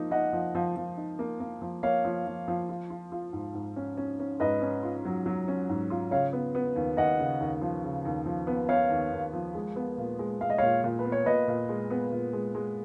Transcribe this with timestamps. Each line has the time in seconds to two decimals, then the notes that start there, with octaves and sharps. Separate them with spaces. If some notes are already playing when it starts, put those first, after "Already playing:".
Already playing: F3 A#3 D#4
0.11 D#4 D#5 F#5
0.33 F3
0.55 F3
0.76 F3
0.97 D#4
1.19 A#3
1.40 A#3
1.61 F3
1.83 A#3 C#5 F5
2.05 F3
2.26 F3
2.48 F3
2.69 F4
2.90 F4
3.12 F4
3.33 G#2
3.54 G#2
3.76 C#4
3.97 C#4
4.20 C#4
4.40 G#2 B4 D#5
4.62 C#4
4.83 F4
5.05 F#3
5.26 F#3
5.48 C#4
5.69 G#2
5.90 F4
6.11 C#3 C#5 F5
6.33 B3
6.55 B3
6.76 D#2
6.97 D#2 D#5 F#5
7.19 C#3
7.40 D#2
7.61 F3
7.83 C#3
8.05 D#2
8.26 F3
8.47 B3
8.69 B3 C#5 F5
8.90 D#2
9.12 D#2
9.33 F3
9.54 G#3
9.76 B3
9.98 A#2
10.19 G#3
10.40 G#3 F5
10.50 D#5
10.58 A#2 C#5 F5
10.84 A#2
10.99 B4
11.05 B3
11.12 C#5
11.26 A#2 B4 D#5
11.48 A#2
11.69 G#3
11.90 B3
12.12 A#2
12.33 G#3
12.55 G#3